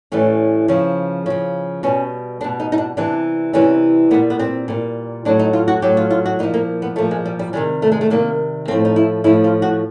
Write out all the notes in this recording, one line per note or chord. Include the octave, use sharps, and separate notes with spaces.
A2 E3 G3 C#4
C#3 F3
C#3 F3
B2 G3 C#4
B2 G3 D4
D#4
D#4
D4
C3 E3 G3 D4
C3 E3 G3 C#4
A#2 G3 B3
B3
C4
A#2 G3
A2 F#3 D4
D#4
F4
F#4
A2 F#3 G4
F4
F4
F#4
A#2 F3 D#4
A#3
B3
A#2 F3 A3
G#3
G3
G3
C3 D#3 G3 G#3
A3
G#3
A3
C3 D#3 G3 A#3
A2 F3 C4
D#4
E4
A2 F3 E4
F4
F#4